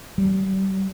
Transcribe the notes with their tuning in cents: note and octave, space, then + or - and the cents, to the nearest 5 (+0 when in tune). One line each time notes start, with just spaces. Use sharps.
G3 -35